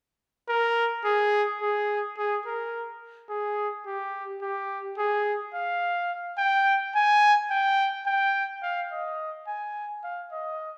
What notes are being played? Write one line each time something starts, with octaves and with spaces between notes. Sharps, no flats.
A#4
G#4
G#4
G#4
A#4
G#4
G4
G4
G#4
F5
G5
G#5
G5
G5
F5
D#5
G#5
F5
D#5